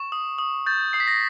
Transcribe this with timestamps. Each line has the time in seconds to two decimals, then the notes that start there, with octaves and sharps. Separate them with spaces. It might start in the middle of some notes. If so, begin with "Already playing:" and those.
Already playing: C#6
0.12 D#6
0.39 D#6
0.66 G6 A6
0.93 D#6 C7
1.00 B6
1.07 A#6